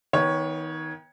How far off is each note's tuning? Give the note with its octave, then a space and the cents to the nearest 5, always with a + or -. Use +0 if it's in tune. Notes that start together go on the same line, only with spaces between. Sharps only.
D#3 +30 B3 -5 C#5 +0